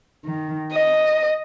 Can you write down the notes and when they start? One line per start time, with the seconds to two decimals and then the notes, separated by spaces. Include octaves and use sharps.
0.25 D#3
0.72 D#5